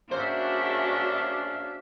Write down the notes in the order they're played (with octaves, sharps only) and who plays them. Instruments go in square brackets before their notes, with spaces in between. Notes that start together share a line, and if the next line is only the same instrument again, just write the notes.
[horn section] A#3 C#4 D4 [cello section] F#4 G#4 E5 [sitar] C5 [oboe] F5